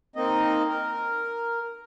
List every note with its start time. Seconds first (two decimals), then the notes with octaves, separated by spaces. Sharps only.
0.16 A#3 C4 D#4 D#5
0.68 A#4